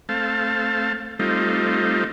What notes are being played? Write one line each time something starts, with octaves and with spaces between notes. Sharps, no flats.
A3 C4 F5 A5
G3 A3 C4 D#4 F4